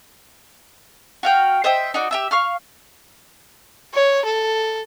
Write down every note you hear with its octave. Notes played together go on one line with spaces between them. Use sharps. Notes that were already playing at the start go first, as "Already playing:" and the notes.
F#4 F5 G5
C5 D#5 E5 G5
D#4 F#4 D5
G4 E5 E6
F5 C#6 F6
C#5
A4